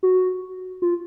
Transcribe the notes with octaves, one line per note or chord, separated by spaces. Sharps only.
F#4
F4